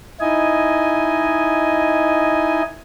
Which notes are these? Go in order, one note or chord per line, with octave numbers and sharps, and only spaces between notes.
D#4 E4 D#5 G#5